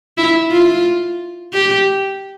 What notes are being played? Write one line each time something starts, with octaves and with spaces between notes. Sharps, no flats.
E4
F4
G4